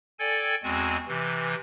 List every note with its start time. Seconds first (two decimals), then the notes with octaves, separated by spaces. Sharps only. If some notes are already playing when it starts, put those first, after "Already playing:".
0.19 A4 D5 G5 G#5 G#6
0.63 E2 G#3 C4 F#4 G#5
1.08 C3 E3